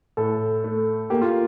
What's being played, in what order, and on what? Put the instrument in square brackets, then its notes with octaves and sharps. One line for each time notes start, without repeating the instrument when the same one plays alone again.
[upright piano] A2 [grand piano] A4
[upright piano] A3
[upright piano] A#3 [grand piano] G4
[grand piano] F4